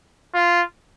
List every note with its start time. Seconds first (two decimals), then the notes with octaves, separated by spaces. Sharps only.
0.34 F4